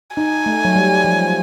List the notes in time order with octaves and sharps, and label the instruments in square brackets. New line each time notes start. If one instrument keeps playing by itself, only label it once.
[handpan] D#4 [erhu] G#5
[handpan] A3
F#3
G3
F3